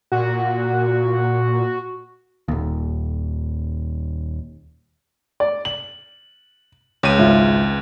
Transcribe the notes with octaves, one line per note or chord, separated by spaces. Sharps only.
A#2 F#4
D#1 D#2
D5
F#7
C#2 C#5 D#7
G#1 F4 E5